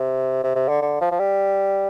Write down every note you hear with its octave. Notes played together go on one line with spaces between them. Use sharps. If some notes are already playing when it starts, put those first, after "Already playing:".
Already playing: C3
C3
C3
D3
D3
F3
F3
G3